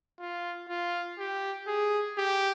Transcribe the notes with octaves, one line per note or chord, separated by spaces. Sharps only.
F4
F4
G4
G#4
G4